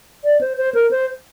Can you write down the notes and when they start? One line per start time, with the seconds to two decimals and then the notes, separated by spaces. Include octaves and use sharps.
0.25 D5
0.41 C5
0.58 C5
0.75 A#4
0.91 C5